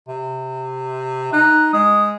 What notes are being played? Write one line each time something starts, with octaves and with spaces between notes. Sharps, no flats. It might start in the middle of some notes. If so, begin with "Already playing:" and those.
C3
D#4 F#6
G#3 D#6